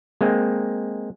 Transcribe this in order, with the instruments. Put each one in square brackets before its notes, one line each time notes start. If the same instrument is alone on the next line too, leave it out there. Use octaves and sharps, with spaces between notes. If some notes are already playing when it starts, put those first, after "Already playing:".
[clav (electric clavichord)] G#3 A#3 C4